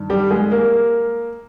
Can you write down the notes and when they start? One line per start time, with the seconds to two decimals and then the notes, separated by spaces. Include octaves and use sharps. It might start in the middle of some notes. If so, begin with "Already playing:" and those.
Already playing: G2 D#3
0.10 G3 G4
0.31 G#3 G#4
0.51 A#3 A#4